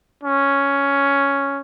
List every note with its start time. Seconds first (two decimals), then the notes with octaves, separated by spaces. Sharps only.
0.23 C#4